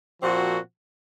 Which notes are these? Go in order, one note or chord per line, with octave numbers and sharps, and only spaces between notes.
A#2 F3 C4 F#4